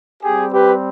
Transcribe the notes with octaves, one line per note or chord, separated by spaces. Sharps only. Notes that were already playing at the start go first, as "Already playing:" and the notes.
G3 C4 G4 G#4
G4 B4